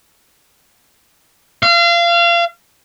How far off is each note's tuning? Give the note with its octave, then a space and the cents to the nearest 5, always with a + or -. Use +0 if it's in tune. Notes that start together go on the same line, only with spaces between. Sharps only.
F5 -30